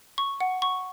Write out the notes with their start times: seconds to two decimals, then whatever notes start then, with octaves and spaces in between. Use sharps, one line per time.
0.18 C#6
0.40 F#5
0.62 C#6